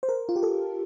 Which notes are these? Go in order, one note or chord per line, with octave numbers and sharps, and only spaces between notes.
C5
A#4
F4
G4
A4